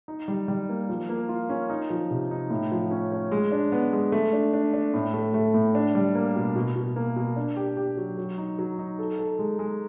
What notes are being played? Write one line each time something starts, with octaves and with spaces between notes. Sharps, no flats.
D#4
G3
G3
A#3
F3
A#3
F4
C#4
D#4
F3
C3
D#4
A2
F3
C#4
C#4
G#3
D4
B3
G#3
A3
D4
D4
D4
A2
A3
A3
A2
D4
G3
A#3
B2
B2
B2
A#3
B2
D4
G4
G4
F#3
F#3
D#4
F#3
D#4
A4
A4
G#3
G#3